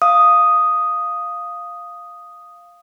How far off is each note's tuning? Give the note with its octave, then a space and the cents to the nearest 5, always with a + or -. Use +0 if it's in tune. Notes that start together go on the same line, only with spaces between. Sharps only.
F5 +0 D#6 +0